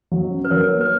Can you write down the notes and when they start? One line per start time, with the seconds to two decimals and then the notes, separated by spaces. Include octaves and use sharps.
0.11 F#3
0.31 C#4
0.45 B4
0.51 F#3 A#4 C#5
0.70 A#3
0.81 B4